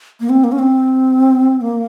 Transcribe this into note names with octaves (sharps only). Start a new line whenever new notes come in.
A#3
C4
A#3
C#4
C4
A#3